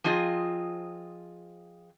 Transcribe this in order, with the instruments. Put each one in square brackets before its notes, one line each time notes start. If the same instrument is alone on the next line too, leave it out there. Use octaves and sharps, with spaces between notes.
[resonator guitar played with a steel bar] F3 C4 F4 G#4 D#5